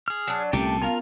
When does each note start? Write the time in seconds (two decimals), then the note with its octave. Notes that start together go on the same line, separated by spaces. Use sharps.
0.08 G#4 F6
0.27 F#3 D4
0.53 C2 A#2 A3 C#4 G4 G5 A5
0.82 B3 F4 A#4 F5